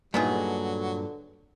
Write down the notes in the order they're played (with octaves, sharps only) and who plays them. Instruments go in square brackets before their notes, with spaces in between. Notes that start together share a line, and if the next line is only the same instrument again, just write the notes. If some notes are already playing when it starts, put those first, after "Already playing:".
[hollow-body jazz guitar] G2 A#2 [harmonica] F#3 [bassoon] G#3 [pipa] B3 D#4 G#4
[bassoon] D3